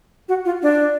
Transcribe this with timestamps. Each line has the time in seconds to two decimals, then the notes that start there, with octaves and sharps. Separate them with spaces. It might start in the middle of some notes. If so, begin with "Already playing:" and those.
0.29 F#4
0.45 F4
0.63 D4